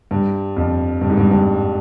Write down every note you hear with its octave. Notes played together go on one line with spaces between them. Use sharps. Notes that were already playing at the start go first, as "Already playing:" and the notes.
G2
F2
G2
G#2
G2
G2